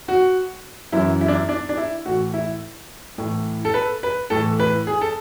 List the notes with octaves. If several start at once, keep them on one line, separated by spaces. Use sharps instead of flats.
F#4
F#2 E3 E4
E4
D4
E4
D4
D4
E4
A2 E3 F#4
E4
A2 E3
A4
B4
B4
A2 E3 A4
B4
G#4
A4